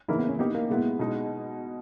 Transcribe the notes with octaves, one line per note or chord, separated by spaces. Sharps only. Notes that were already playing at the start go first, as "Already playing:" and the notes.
C#3 E3 A#3 D#4 E4 A#4
B3
C#4
A#3 B3 D#4 G4
A#3
B2 G#3 B3 E4
B2 G#3 D#4